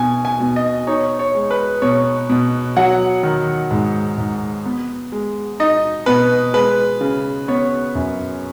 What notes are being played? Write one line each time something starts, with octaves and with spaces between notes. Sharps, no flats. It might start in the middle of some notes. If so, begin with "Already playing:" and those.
Already playing: B2 G#5
G#5
B2
D#5
D#4 C#5
C#5
G#3
B4
B2 C#5
B2
F#3 F#5
D#3
G#2
G#2
B3
G#3
D#4 D#5
B2 B4
G#3 B4
C#3
B3 C#5
F#2